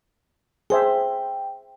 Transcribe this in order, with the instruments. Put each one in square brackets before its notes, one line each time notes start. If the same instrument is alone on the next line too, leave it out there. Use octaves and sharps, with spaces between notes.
[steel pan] G#4 C5 E5 [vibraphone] G5